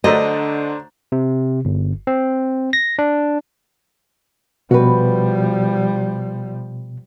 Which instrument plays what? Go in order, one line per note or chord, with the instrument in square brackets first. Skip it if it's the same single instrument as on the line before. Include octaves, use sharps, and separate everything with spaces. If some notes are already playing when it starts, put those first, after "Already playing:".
[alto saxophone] D3 [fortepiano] F#3 A3 [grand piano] D4 C5 A#5 [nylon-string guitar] D#5
[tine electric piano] C3
G1
C4
A#6
D4
[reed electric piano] B2 [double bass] F3 G3 [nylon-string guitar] F#4 B4